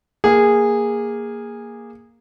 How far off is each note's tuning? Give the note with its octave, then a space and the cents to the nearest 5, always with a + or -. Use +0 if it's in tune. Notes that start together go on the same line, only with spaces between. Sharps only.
A#3 +0 G#4 -15